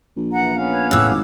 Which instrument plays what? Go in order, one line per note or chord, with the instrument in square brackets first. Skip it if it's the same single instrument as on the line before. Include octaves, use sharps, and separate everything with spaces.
[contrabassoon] A#1
[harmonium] E3 [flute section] F#5 A#5
[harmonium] B3 C#4 F5
[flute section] B4 C#5
[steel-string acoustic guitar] A2 C#3 [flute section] D6 E6 F#6
[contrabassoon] G#1 [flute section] D6